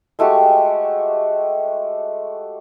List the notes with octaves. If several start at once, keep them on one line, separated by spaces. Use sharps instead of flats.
G#3 A3 F#4 G4